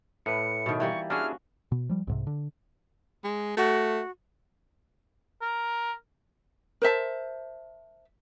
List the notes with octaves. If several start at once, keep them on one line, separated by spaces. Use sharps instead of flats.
A2 B4 C#7
B2 D#3
E3 G3 A#3 C#6
C#4 D4 E4 F#4 G#4 F6
B2
F3 G3
C2 G#2 C3
D3
G#3
A3 F#4
A#4
A#4 C5 E5 A5